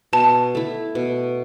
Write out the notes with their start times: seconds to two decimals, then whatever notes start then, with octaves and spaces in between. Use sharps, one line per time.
0.13 B2 A5
0.55 A3 E4
0.95 B2